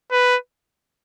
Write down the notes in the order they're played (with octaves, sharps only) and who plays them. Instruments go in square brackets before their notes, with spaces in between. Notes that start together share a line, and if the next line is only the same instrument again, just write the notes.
[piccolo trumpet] B4